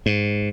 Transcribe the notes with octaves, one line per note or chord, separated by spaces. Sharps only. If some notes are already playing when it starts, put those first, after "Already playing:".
G#2